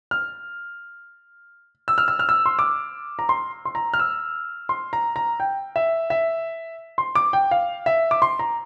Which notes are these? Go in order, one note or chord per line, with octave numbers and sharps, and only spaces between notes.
F6
E6
F6
E6
F6
E6
C6
D6
A#5
C6
C6
A#5
F6
E6
C6
A#5
A#5
G5
E5
E5
C6
D6
G5
F5
E5
D6
C6
A#5